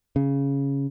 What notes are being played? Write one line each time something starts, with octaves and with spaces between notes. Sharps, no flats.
C#3